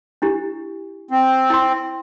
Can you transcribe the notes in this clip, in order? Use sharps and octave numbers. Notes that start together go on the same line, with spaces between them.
D4 E4 G4
C4
E4 G5 C6